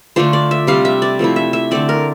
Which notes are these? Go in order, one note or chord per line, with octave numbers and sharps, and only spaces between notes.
D3 A3 D4 F4 C5
D5
E5
C3 G3 C4 F5
E5
D5
F3 A3 C4 E4
E5
E5
D3 A3 C4 D5
A#4